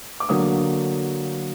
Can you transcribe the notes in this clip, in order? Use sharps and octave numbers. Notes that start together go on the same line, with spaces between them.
D6
D3 F#3 A#3 D#6